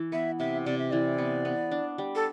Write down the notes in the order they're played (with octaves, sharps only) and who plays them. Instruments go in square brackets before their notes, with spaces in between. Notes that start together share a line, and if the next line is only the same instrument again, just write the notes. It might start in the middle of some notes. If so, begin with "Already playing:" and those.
Already playing: [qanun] E3
[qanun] B3 [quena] E5
[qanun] C3 [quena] E5
[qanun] C3 [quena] D5
[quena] E5
[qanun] E3 [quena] D5
[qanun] B3
B3
D4
G3
[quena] A4